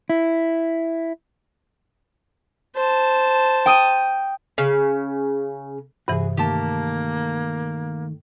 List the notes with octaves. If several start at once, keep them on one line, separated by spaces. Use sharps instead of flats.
E4
C5 A5
G5 D#6 D#7
C#3
G2 C3 E3 F#4 G#4
D#3 A3 A#3 G4 A5